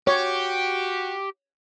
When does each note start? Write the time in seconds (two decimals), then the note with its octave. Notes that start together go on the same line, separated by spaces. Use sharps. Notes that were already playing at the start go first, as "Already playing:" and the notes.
0.07 F#4 G4 C#5